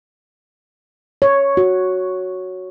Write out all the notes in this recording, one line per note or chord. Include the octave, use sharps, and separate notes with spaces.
C#5
F#4